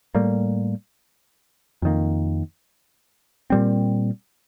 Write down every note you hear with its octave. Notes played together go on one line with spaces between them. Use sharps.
A2 G3 A#3
F2 D#3 A#3
A#2 G3 C4